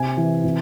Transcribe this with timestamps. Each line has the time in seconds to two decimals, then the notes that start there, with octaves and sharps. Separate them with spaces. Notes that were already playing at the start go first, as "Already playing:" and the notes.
Already playing: C3 G#5
0.17 E3
0.44 C3